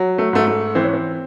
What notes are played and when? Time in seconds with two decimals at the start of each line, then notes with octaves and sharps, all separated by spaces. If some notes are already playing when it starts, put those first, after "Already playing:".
Already playing: F#3
0.18 A3
0.33 G#2 A3
0.47 A3
0.75 E3 C4
0.84 C#4
0.93 C4